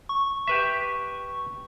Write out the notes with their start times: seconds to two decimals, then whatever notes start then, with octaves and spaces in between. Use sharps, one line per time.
0.09 C#6
0.48 G4 B4 E5